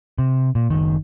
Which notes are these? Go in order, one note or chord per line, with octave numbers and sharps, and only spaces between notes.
C3
A#2
F#1 D#3